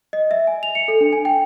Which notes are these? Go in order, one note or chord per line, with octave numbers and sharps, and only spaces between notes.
D#5
E5
G#5
F7
C#7
A4
D4
G#5
G5